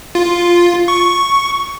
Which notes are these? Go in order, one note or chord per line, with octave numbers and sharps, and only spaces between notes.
F4
C#6